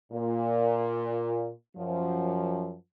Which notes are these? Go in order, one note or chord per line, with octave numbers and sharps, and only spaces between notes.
A#2
F#2 F3